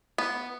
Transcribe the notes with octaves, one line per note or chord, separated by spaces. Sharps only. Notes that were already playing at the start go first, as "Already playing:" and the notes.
B3